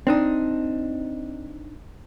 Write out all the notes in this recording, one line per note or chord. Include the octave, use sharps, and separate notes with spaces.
C4 D4 D#4